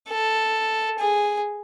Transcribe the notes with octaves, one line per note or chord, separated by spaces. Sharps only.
A4
G#4